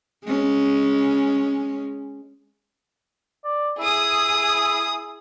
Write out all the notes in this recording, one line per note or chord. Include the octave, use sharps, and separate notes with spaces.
G#3 C#4
D5
E4 G#4 D#6